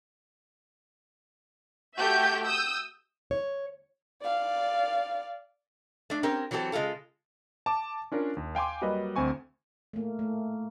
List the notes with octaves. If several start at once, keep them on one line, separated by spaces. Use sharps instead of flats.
A3 F#4 G4 A4 E5 G6
D#6 E6 G6
C#5
D5 F5
A3 D4
C4 C#4 G4 A#4
E3 F#3 C4 G4 A4
C#3 G#3 C4 F4 A4
A5 D6
C#4 D4 F4 A#4
D#2
F5 G5 G#5 C6 D6
F#3 G3 A#3 B4 D#5
D2 C4 G#5 C#6
A3 A#3
A3